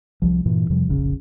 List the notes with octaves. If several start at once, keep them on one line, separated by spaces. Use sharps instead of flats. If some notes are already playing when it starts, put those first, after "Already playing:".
C2 F3
G2 A#2 E3
F2 C3 F3 G3
F1 A#1 C#3